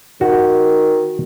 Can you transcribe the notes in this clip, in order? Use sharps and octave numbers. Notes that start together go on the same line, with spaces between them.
D#3 F#4